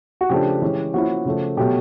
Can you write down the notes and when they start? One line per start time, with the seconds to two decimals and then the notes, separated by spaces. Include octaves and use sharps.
0.21 F#4
0.30 C#3 F3 A3 D4 G4
0.62 E3 G#3 C#4
0.94 F3 A#3 C#4 E4 F#4
1.25 C#3 F3 A3
1.57 B2 F#3 A3 G4